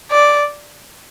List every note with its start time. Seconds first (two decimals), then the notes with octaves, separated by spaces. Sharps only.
0.11 D5